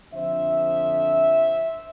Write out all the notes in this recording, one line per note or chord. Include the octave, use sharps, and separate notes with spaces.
F2 D3 F3 C5 E5